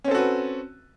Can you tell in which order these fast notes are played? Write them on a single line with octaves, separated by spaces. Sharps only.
C#4 C4 A4 F#4 B4